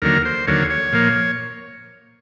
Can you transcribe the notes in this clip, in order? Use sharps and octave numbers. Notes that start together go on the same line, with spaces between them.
D#2 D3 F#3 A#3 A#4
C5
D#2 D3 F#3 A#3 C#5
C#5
A#2 F3 A#3